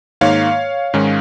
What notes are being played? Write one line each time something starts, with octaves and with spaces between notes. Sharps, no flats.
G#2 D#3 A#3 C#5 F5
G#2 D#3 G#3 C#4